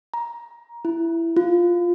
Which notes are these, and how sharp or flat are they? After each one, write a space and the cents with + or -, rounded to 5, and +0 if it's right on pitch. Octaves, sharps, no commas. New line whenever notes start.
A#5 +15
E4 +15
F4 +0